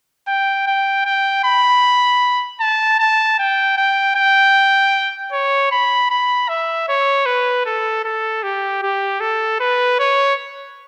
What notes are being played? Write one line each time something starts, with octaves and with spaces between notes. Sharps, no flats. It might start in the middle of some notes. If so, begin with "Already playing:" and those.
G5
G5
G5
B5
A5
A5
G5
G5
G5
C#5
B5
B5
E5
C#5
B4
A4
A4
G4
G4
A4
B4
C#5